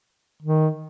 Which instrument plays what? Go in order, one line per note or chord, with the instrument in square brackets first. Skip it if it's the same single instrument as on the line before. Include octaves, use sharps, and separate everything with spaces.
[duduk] D#3